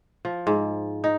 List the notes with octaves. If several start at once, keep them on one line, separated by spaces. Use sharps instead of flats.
F3
G#2
D#4